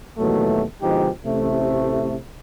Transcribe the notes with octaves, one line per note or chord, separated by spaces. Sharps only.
D#2 B2 E3 F#3 A3
B2 D3 F3 G#3 D#4 G4
A1 C3 A3